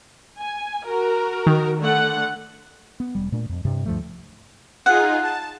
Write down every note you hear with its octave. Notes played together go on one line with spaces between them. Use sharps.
G#5
F#4 A#4
D#3
D3 A3 F#5
B3
E1 G3
A#2 A3 D4
F2
G2 C3
D2 G2 F3 A3
D#4 F4 G#4 F#5
A5